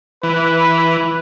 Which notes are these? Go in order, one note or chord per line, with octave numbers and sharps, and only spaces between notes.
E3 B4